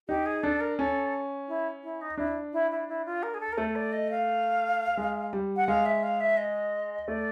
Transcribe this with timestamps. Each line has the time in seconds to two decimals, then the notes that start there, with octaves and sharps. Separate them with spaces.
0.08 D#4 G4
0.26 G#4
0.43 D4 A4
0.61 A#4
0.78 C#4 A4
1.48 E4
1.83 E4
2.01 D#4
2.17 D4 E4
2.53 E4
2.71 E4
2.88 E4
3.05 F4
3.23 A#4
3.34 G#4
3.40 A4
3.52 A#4
3.57 A3 A4
3.76 D5
3.93 D#5
4.11 F5
4.97 G#3
5.33 G3
5.57 F#5
5.68 G#3 F5
5.86 E5
6.03 F5
6.20 E5
6.37 D#5
7.08 A3 D5